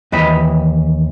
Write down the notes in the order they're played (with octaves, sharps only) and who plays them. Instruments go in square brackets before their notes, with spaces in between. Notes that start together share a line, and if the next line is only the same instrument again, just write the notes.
[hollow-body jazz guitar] D#2 E3 D#5 B5